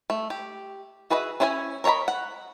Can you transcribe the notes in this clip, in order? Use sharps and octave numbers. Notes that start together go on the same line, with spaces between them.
A3
G4
F#4 G#4 B4 D#5 E5
C#4 E4 C5 C#5 G#5
A#4 C#5 D#5 A#5 B5
F#5